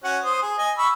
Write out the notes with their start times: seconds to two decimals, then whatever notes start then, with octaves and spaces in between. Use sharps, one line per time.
0.04 C#4 F#4 F#5
0.24 C5 D#6
0.42 G#4
0.58 D#5 G#5
0.78 B5 C#6 E6